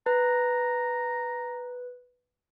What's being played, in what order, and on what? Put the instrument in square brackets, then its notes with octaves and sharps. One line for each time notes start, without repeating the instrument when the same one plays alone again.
[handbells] B4 [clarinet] A#5